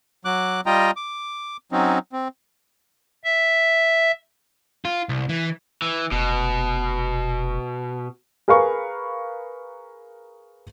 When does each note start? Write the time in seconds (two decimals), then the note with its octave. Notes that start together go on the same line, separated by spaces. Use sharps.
0.25 F#3 D6 F#6
0.66 G3 F4 D#5 G5 A#5
0.96 D6
1.72 F#3 C4 C#4 D#4
2.13 C4
3.24 E5
4.85 F4
5.09 C2
5.29 E3
5.82 E3
6.12 F1 B2
8.48 G#4 A#4 B4 F5 B5 C#6